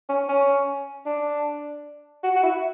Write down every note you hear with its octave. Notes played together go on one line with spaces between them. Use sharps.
C#4
C#4
D4
F#4
F#4
E4